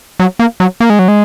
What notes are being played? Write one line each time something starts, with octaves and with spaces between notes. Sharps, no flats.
F#3
A#3
F#3
A#3
G#3
F#3
G#3